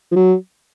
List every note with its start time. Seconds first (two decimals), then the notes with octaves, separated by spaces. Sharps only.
0.12 F3
0.16 F#3